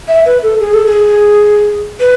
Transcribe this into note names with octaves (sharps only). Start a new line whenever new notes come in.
E5
B4
A4
G#4
A4
G#4
B4